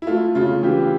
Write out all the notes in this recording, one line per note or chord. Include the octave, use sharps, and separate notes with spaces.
E4
A3 F4
C#3 F4
E3 G4